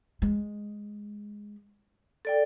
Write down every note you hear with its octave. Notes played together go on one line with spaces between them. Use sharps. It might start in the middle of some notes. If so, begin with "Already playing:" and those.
G#3
A4 D5 G5